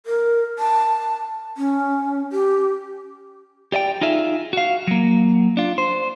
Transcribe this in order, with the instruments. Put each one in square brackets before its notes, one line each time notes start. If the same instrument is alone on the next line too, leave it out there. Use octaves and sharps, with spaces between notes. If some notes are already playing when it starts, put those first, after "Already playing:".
[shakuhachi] A#4
A5
C#4
G4
[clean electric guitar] G4 D5 D#5 G5
D#4 F4 G#4 E5
F#4 F5
F#3 A#3
D4 F4
C5